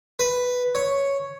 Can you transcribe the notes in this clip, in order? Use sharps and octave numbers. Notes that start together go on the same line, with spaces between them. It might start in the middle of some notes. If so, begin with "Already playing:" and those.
B4
C#5